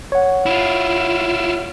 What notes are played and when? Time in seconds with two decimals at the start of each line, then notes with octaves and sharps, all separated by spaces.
0.12 C#5 F#5
0.46 E4 F4